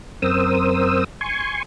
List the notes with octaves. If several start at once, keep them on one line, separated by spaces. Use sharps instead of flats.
F#2 C4 A#4 C5 D#6 E6
G#5 C6 C#6